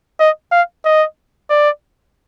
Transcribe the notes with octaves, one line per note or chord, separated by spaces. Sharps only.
D#5
F5
D#5
D5